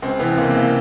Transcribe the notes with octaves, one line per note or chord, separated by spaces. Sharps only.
C#2 C4
C3 E3 B3
C#2 A#3
A#3
C3 E3